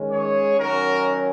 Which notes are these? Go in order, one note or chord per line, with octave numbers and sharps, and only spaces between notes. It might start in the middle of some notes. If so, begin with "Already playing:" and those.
Already playing: D#3 G#3 C#4
G#4 C#5
D#3 F#3 C#4 F#4 A#4